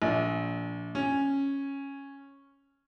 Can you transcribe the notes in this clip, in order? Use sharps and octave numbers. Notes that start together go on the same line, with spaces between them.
A#1
C#4